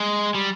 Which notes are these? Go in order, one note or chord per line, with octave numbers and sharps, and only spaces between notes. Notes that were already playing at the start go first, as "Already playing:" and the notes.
Already playing: G#3
G3